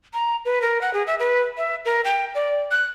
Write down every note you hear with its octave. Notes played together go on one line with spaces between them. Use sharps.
A#5
B4
A#4
F#5
G#4
E5
B4
E5
A#4
G5
D5
F#6